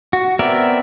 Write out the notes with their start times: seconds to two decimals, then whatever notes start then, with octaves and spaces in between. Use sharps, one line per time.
0.13 F#4
0.39 B3 C4 A#4 D5 E5